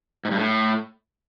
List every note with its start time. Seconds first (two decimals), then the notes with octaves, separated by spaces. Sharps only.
0.25 G#2
0.31 G2
0.38 A2